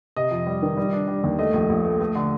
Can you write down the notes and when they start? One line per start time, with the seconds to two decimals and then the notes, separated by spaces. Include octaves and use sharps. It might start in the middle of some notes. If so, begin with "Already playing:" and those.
0.16 C3 D#5
0.31 F2
0.47 G3
0.62 D#3
0.77 G3
0.93 D4
1.08 G3
1.24 D#2
1.39 A3 D#5
1.54 A#1
1.70 A#1
1.85 A3
2.01 A3
2.15 D3